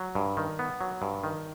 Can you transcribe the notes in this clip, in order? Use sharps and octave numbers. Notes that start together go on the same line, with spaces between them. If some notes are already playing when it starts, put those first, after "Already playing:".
Already playing: F#3
G2
D#3
B3
F#3
G2
D#3